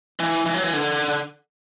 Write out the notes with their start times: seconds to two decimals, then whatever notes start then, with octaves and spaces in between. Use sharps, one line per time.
0.20 E3
0.46 E3
0.54 F#3
0.63 E3
0.73 D3